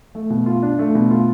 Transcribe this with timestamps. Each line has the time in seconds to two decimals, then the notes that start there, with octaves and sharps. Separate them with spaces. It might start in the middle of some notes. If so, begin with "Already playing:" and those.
0.15 A3
0.30 B2
0.46 F4
0.63 D4
0.79 A3
0.95 B2
1.10 F4